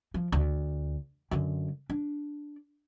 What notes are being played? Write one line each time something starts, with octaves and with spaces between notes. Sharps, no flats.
F3
D2
F#2 D3
D4